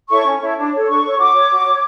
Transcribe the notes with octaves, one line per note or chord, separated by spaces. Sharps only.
E4 A4 C#5 C#6
C#4
E4 A4 C#5
D4
A4 C#5
D4 C#6
A4 C#5
F#4 D6
C#5
F#4
C#5